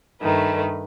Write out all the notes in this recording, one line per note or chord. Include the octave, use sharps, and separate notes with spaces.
G2 D#3 A3 B4